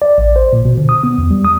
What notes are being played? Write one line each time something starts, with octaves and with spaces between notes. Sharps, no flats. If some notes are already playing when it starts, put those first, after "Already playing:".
D5
A1
C5
A#2
B2
D3
D#6
B3
E2
G3
D#6